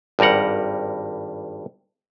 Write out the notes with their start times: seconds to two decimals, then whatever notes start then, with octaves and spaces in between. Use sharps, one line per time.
0.19 G#1 G2 G3 A#4 F#5